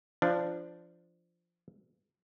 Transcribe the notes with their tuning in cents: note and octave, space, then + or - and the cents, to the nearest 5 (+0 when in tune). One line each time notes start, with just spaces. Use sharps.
F3 -15 D4 +0